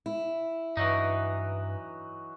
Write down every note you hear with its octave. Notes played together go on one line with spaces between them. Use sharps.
E4
G2 E3 F#3 D#4